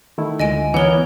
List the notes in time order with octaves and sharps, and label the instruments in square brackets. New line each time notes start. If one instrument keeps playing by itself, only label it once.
[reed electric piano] D#3 A3 E4
[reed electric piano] D2 D3 F4 [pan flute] G#3 [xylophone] D#5 G#5 D7
[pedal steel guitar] E3 B3 A#4 [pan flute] C#5 [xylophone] F#5 G7